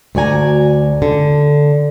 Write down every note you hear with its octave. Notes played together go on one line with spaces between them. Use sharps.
D2 F#4 D5 G#5 A#5
D3